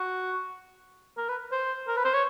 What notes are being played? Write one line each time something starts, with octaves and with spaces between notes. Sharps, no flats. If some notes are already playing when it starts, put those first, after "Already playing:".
Already playing: F#4
A#4
B4
C5
A#4
B4
C5
C#5